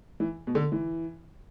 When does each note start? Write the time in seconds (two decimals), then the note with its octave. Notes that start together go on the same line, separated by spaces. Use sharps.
0.20 E3
0.47 B2
0.55 D3
0.72 E3